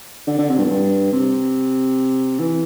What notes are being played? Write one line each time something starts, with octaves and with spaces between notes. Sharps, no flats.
D3
D3
C3
G2
E2
G2
C3
E3